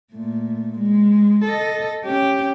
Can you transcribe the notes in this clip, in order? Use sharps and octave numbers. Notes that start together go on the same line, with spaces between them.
A#2 A3
G#3
A4 D#5
C#4 G4